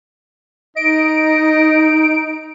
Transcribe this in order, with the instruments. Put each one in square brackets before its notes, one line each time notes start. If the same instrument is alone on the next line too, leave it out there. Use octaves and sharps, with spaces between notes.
[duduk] D#4 [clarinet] D#5 [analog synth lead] D7